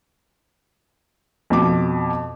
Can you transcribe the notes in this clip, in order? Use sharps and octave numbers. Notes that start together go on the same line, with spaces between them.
F2 B2 D6